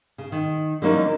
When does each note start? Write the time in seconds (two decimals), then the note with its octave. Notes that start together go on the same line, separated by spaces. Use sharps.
0.18 C#3
0.32 D#3
0.82 D3 E3 F#3 A#3 C#4 D#4